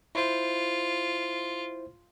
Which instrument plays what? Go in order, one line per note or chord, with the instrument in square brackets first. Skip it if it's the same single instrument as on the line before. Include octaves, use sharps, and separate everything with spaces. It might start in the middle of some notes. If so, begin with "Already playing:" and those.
[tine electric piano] E4 C5 [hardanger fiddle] F4